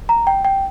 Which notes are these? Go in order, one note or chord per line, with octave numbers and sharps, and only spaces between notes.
A#5
G5
G5